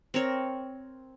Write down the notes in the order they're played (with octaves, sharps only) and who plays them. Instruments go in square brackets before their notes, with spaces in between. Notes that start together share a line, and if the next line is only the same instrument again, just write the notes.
[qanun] C4 A#4 C#5